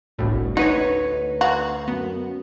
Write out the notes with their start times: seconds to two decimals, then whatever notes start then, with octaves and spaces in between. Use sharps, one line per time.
0.19 G1 C2 A2 E3 D4 F#4
0.57 D2 D#4 F#4 B4 C#5
1.41 F#4 F5 A#5
1.88 F#2 B3